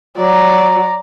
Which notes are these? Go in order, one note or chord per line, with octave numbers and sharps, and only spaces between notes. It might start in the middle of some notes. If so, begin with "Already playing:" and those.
F#3 D5 A#5